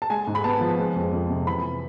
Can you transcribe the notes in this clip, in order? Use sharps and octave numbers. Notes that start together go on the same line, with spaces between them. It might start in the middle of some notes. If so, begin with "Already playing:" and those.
A5
G#3 G#5
G#2
B5
B3 A5
F3
G#3
F2
F2
C3
E3 B5